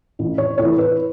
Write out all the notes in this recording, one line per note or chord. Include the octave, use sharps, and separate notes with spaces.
A1
C#5
A2 E3 C#5
B4